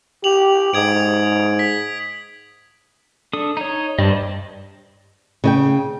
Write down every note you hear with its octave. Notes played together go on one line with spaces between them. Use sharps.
G4 F7 F#7
G#2 D#6 G#6 D7
B6
D4 A4 D#6
D#4 C#5
G2 C5 D5 D#5
C#3 D#5 G5